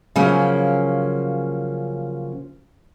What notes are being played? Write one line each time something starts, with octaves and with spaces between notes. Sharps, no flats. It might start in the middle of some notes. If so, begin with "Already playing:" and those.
C#3 F3 F#3 A#3 C#4